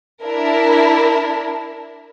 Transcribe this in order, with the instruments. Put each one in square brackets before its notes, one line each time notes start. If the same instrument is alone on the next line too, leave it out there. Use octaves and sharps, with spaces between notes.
[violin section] D4 E4 A#4